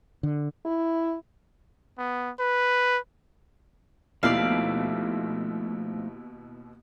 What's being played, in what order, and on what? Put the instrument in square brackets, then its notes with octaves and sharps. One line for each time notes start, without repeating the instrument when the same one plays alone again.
[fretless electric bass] D3
[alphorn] E4
[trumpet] B3
B4
[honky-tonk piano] D#2 B2 E4 [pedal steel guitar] F3 A3 D#4 [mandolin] D5 F5